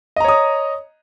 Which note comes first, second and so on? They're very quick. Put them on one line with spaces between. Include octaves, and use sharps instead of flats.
D#5 A#5 C#5 D#6